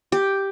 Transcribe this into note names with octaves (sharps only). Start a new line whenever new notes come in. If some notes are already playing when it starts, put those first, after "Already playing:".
G4